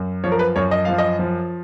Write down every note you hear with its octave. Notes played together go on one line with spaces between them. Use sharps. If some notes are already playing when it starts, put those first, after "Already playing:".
Already playing: F#2
F3 C#5
A#4
B4
F#2 C#5
D#5
F3 F5
D#5
F3